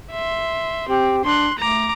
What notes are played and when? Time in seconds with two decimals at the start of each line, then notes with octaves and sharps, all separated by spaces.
0.11 E5 C6
0.89 C4 G4
1.24 D4 C6 F#6
1.59 A3 A#5 D6